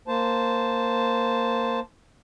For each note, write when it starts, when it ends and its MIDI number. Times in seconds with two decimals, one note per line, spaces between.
0.08 1.80 58
0.08 1.80 72
0.08 1.80 81